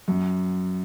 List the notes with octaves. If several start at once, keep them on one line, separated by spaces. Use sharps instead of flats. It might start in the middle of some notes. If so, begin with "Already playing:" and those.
F#2